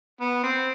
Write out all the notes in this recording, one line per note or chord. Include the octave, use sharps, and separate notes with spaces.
B3
C4